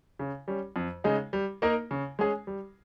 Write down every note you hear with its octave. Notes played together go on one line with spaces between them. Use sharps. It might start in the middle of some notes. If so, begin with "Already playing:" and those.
C#3
G3 C#4
F2
C#3 G#3 D#4
G3
A#3 D#4 A#4
C#3
G#3 C#4 G#4
G3